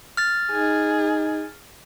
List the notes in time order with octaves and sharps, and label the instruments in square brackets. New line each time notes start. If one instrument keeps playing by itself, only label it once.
[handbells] F6 A6
[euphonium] D#4 [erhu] G#4